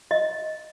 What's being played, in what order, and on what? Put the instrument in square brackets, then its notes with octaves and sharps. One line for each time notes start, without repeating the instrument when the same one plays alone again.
[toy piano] D#5